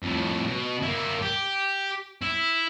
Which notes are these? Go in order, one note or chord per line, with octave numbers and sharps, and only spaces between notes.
F2 A2
B2
A#3 E4
G4
E4